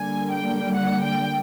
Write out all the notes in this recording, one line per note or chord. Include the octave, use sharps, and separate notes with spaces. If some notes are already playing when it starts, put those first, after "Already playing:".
Already playing: D3 G3 A#3 G#5
G5
F#5
G5